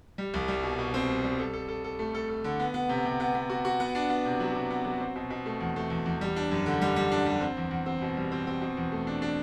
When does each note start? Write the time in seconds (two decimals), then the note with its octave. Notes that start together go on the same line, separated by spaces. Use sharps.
0.18 G3
0.34 C2
0.48 G3
0.63 B2
0.79 B2
0.94 C4
1.09 G3
1.24 G3
1.39 A4
1.53 A4
1.68 A4
1.84 A4
1.99 A3
2.15 A4
2.29 A4
2.44 D3
2.60 B3
2.74 B3
2.89 C3
3.05 C3
3.20 B3
3.35 B3
3.50 F#4
3.65 F#4
3.80 B3
3.95 D4
4.09 B3
4.25 C3
4.40 F#3
4.55 C3
4.71 B3
4.85 F#3
5.00 C4
5.16 B2
5.30 B2
5.46 A3
5.60 E2
5.76 A3
5.90 E2
6.06 E2
6.21 G3
6.36 D4
6.52 F#2
6.66 D3
6.81 G3
6.96 G3
7.11 D4
7.26 G3
7.41 C4
7.57 E2
7.71 E2
7.86 C4
8.02 B2
8.17 G3
8.32 C4
8.47 C4
8.61 B2
8.77 E2
8.92 A3
9.07 D4
9.22 D4